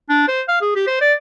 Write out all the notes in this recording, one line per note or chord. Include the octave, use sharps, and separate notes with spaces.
D4
C5
F5
G#4
G4
C5
D5